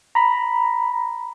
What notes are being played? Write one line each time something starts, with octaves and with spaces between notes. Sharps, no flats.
A#5 B5